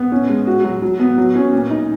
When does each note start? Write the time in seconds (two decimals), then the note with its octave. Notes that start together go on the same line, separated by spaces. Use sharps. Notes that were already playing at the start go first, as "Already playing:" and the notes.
Already playing: B3
0.12 C#4
0.29 G#3
0.47 F#4
0.64 F#3
0.82 F#3
1.00 B3
1.18 F#3
1.35 C#4
1.53 A#2
1.70 D#4